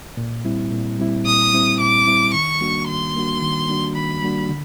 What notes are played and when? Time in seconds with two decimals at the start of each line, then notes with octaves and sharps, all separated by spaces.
0.17 A#2
0.45 G3 C4 E4
0.71 A#2
0.99 G3 C4 E4
1.26 A#2 D#6
1.53 G3 C4 E4
1.80 A#2 D6
2.07 G3 C4 E4
2.34 D#3 C#6
2.60 G3 A#3 D4 F#4
2.88 D#3 C6
3.15 G3 A#3 D4 F#4
3.42 D#3
3.68 G3 A#3 D4 F#4
3.96 D#3 B5
4.23 G3 A#3 D4 F#4
4.49 D3